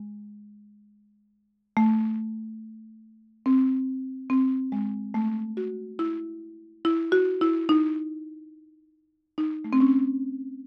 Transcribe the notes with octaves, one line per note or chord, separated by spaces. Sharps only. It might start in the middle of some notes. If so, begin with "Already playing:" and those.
Already playing: G#3
A3
C4
C4
G#3
A3
F#4
E4
E4
F#4
E4
D#4
D#4
A3
C4
C#4